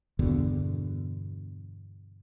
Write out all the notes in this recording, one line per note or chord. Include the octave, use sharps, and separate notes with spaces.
E2 G2 B2 D3